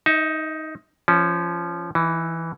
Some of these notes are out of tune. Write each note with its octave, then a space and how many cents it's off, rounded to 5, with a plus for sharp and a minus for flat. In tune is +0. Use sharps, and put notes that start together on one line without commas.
D#4 +10 E5 -25
F3 -20 C#4 +0
E3 +0 D#4 +30